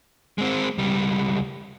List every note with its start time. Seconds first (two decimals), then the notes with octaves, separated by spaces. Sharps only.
0.38 G#3 C4
0.78 C#2 G3